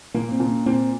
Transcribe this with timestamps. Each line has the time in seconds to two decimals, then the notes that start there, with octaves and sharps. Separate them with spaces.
0.14 A#2 A#3
0.32 C4
0.40 A#2
0.49 C#4
0.66 A#2 C4